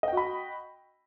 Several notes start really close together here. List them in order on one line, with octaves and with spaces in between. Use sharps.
D#5 G5 F#4 B5